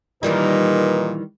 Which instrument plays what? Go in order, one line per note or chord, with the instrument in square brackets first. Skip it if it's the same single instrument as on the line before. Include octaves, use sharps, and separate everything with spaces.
[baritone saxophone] A#2 [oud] D#3 E3 G3 [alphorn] D#4 [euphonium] B4